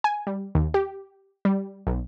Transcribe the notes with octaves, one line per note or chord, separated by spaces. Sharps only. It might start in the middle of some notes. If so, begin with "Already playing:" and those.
G#5
G3
D#2
G4
G3
B1